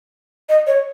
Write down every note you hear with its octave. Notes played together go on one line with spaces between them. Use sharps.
D#5
C#5